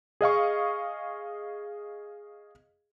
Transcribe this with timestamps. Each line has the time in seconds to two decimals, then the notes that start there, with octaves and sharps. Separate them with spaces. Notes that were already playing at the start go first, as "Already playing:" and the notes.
0.21 G#4 D#5 F5 C#6